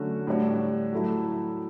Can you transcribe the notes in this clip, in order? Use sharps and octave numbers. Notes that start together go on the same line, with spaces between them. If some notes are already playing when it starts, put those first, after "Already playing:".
Already playing: D3 F#3 A3 C#4 F#4
A2 G3 D4 F#4 C#5
F#3 A3 E4